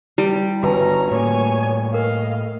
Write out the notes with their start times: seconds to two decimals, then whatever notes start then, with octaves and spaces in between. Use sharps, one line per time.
0.18 G3 E4
0.63 G1 C#4 F#4 B4 A5 A#5
1.11 A2 A#3 C#5 G#5
1.63 D5
1.94 A#4 D#5 F5